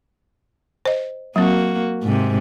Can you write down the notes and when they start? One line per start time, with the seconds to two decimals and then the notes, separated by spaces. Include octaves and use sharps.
0.85 C5 D#5
1.36 F#3 A#3 C4 F#4
2.03 G#2 C3